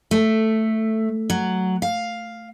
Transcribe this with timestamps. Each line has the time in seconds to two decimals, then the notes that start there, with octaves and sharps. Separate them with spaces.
0.11 A3
1.30 F#3
1.82 F5